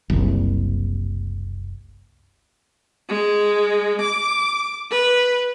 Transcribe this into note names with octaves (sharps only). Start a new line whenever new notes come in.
F#1 C2
G#3
D6
B4